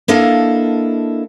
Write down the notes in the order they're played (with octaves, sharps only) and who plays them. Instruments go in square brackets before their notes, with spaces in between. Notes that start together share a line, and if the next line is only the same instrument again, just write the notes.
[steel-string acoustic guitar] A#3 D4 E4 A4 D#5 F5